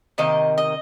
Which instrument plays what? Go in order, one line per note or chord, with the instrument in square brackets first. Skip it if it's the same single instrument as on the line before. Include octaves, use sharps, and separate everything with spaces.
[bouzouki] C3 D#3 A#3 D#5
D#5